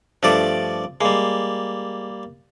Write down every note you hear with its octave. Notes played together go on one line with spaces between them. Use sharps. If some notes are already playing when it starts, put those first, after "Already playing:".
G2 F3 A3 D5 D6
G3 G#3 A#3